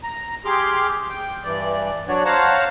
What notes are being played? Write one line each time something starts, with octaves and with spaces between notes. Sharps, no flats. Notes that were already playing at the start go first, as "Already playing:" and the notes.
A#5
G4 G#4 C6 D6 F6
G5
G2 E3 D5
F#3 D4 F#4 C#5 D5
C5 C#5 F5 F#5 A5 A#5